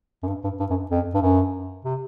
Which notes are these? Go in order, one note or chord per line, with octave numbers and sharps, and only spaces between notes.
F#2
G2
G2
G2
F#2
F2
G2
F#2
C3